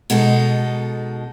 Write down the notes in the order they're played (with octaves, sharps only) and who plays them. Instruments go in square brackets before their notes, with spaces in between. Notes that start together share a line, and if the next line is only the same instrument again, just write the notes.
[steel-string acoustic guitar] B2 G#3 D#4 A4